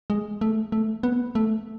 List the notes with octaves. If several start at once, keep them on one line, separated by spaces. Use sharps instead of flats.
G#3
A3
A3
B3
A3